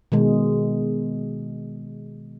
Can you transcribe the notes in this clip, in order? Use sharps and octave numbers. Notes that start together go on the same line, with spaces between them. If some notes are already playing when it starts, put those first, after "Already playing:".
B2 D#3 G#3